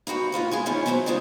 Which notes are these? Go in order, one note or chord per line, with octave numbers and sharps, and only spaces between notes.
A#3 B3 F#4 G4
A2 F4 B4 F#5
G#3 B3 G#4
D#3 E3 C#4
F#3 B3 C4 A4 C5
C#3 F3 G3 G#3 C4